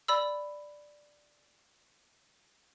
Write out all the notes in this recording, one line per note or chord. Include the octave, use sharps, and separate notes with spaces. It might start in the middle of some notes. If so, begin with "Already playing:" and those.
D5 B5 E6